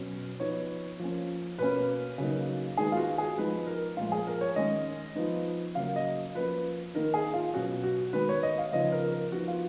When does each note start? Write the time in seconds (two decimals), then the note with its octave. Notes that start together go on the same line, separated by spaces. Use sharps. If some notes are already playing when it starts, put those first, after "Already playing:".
Already playing: B2 F#3 C#4
0.40 F3 B3 D#4 C#5
0.99 F3 A#3 C#4
1.58 B2 A#3 C#4 B4
2.18 C#3 F#3 A#3 D#4
2.77 D#3 G#3 B3 D#4 G#4
2.92 F4
2.97 F#4
3.18 G#4
3.37 F3 G#3 B3 D#4 B4
3.67 A#4
3.97 A#2 F3 G#3 F4
4.12 G#4
4.27 A#4
4.41 C#5
4.56 D#3 G#3 C#4 D#5
5.15 F3 B3 D#4
5.75 C#3 F#3 A#3 F5
5.96 D#5
6.34 F3 A#3 C#4 B4
6.94 D#3 A#3 D#4 A#4
7.14 G#4
7.34 F4
7.54 B2 F#3 C#4 F#4
7.84 F#4
8.13 D#3 G#3 B3 B4
8.29 C#5
8.43 D#5
8.58 F5
8.73 C#3 F3 B3 D#4 D#5
8.92 A#4
9.12 A#4
9.32 F3 B3 D#4 F#4
9.48 F4